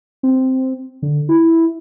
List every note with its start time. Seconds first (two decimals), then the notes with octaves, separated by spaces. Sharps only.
0.23 C4
1.02 D3
1.29 E4